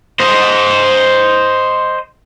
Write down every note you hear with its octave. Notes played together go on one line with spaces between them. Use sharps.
C5 D#5